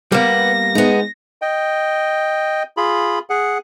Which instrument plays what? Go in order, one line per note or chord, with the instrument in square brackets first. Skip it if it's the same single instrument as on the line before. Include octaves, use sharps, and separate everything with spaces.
[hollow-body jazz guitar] G3 A#3 [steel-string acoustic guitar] B3 [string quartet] A#6
[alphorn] G#3 [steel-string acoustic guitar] B3 D#4
[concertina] D#5 G5
F4 G#4 B5
G#4 F#5